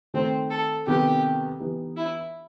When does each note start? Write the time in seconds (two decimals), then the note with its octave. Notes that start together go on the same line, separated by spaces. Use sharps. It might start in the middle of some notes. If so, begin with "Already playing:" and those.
0.14 D#3 A3 C4 D#4
0.51 A4
0.87 C3 D#3 G3 B3 G4
1.60 E3 B3 D#4 G4
1.97 E4